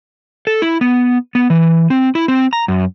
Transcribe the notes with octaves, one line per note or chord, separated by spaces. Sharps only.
A4
E4
B3
B3
E3
C4
E4
C4
A#5
F#2